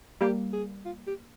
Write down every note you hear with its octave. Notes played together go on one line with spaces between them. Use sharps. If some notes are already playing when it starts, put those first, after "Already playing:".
G3 A#3 G4
G#4
F4
G4